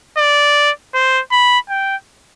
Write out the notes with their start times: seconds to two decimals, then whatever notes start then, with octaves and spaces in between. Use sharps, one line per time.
0.18 D5
0.94 C5
1.32 B5
1.69 G5